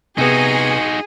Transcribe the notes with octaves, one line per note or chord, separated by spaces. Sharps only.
C3 B3 D#4 F#4 G#4